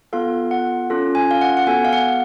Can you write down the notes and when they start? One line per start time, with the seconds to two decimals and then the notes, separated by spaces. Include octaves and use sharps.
0.13 B3 F4 A4 F5
0.51 F#5
0.90 C#4 F4 A4
1.15 G#5
1.31 F5
1.41 F#5
1.57 F#5
1.67 B3 F#4 A4 G#5
1.85 F5
1.93 F#5